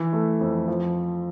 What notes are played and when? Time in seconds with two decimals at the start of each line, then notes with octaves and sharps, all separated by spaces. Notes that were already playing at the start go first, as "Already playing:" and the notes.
Already playing: E3
0.13 A3
0.41 F2
0.68 F3